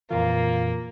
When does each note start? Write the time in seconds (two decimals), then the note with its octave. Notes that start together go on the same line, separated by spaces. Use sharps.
0.11 F2 A#2 E3 A#3 F4